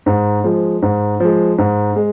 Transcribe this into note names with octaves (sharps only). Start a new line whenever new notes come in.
G#2
F3 G#3
G#2
F3 G#3
G#2
G#3